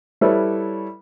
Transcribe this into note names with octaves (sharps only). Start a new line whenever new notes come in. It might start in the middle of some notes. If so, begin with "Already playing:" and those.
G3 E4 A4 B4 C#5